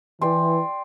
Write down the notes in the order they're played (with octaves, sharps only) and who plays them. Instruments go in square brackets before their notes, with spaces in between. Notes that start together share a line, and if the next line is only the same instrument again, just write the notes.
[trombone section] E3 [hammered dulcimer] D5 G5 C6